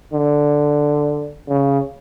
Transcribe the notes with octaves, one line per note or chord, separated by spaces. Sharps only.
D3
C#3